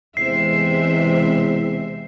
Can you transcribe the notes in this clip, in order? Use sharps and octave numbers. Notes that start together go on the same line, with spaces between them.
E2 C3 E3 G#3 C4 C5 E5 C7